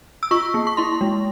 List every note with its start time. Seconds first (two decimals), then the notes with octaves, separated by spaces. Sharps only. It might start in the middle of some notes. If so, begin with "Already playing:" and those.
0.23 E6
0.31 F4 C#6
0.54 A#3
0.67 C#6
0.77 E4 C6
1.01 G#3